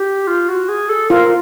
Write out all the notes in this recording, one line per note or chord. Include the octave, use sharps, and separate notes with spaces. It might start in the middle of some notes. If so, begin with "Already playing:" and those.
Already playing: G4
F4
F#4
G#4
A4
F4 A#4